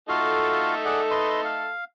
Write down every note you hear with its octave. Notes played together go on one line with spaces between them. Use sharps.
A3 D#4 F4 F#4 A4 F5
G#4 D5 F#5
B4 D#5 C6
F5